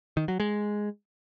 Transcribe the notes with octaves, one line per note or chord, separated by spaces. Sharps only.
D#3
F#3
G#3